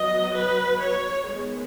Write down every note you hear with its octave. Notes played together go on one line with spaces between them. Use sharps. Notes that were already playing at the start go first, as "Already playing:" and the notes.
Already playing: F#3 B3 D#5
B4
C#5
D#3 G#3 B3